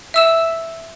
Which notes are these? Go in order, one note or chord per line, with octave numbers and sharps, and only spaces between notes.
E5 E6 E7